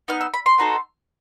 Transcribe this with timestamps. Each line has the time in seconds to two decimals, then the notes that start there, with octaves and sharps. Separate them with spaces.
0.08 B3 D#4 F6
0.21 E6
0.34 B5
0.46 C6
0.58 B3 D#4 F#4 A4